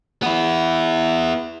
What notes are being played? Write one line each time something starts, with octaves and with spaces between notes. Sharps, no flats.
B3 E4